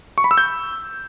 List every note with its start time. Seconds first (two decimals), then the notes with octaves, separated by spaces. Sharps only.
0.18 C#6
0.24 B5
0.31 E6
0.38 G6